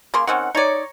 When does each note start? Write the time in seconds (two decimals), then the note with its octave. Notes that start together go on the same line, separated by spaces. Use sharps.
0.14 C#3 A#3 C6
0.27 D#3 C4 C#4 F#5
0.55 D#4 C#5 D5 A#5 C#6